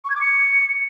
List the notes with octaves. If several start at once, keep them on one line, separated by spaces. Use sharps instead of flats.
C#6
G#6
D6
C#7